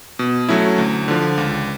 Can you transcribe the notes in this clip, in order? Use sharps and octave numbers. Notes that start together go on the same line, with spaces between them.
B2
F#3 A3 C#4 E4
D2
D3 F3
C#2